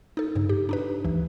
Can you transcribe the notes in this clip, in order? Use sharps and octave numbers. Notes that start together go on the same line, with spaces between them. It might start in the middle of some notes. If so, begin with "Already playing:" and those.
D#4 A4
G2 C#3
G4
D4 D#4 B4
D2 E3